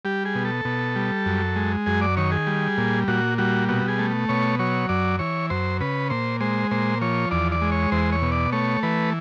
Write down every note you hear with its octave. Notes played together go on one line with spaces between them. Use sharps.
G3 G4
G#4
B2
A4
B2
G3
F#2
G#3
F#2 G#4
D5
D#3 C#5
G#4
G3
A#2
A#2 F#4
G3 F#4
B2 F#4
G#4
A3
B2 C#5
F#3 C#5
F#2 D5
E3 C#5
F#2 C5
C#3 B4
A#2 C5
G#3 C5
A#2 C5
F3 C#5
E2 D5
D5
G#3
C#5
E2 C5
C#5
B2
D5
A3 C#5
E3 B4